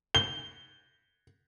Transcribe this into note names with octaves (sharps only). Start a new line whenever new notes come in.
G7